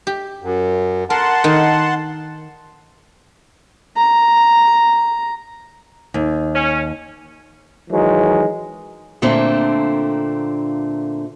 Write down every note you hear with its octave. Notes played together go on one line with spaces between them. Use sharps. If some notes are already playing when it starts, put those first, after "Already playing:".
G4
F#2
A#4 F#5 A5 C6
D#3 A#4
A#5
D#2
C#4
D#3 E3 F#3 G#3
A#2 D3 A3 A#3 C4 D4